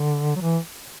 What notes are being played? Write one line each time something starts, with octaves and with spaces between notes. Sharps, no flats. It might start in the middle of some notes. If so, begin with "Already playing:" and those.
Already playing: D3
F#3
E3